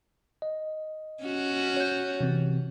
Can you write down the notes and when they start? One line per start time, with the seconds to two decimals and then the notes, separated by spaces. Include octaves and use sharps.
0.42 D#5
1.24 C#4 F#4
1.77 C#5 G6
2.21 C3 E3 C4